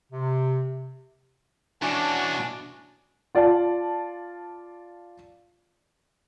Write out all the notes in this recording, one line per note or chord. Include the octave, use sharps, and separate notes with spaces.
C3
E2 B2 C#4 D4 F#4
F4 D5 F5 A5